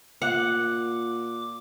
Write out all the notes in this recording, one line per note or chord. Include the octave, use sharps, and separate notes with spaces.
A#2 F#5 D6